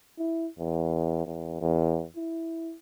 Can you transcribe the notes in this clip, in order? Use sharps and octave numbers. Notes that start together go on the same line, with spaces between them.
E4
E2
E2
E2
E4